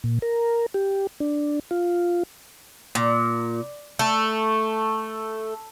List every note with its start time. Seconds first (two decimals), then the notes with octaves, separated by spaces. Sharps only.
0.04 A#2
0.22 A#4
0.74 G4
1.20 D4
1.71 F4
2.95 A#2
3.99 A3